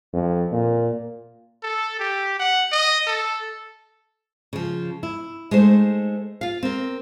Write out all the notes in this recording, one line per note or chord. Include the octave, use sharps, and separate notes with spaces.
F2
A#2
A4
G4
F#5
D#5
A4
C#3 F3
E4
G#3 A3 D#4 C5
F4 F5
C4 A#4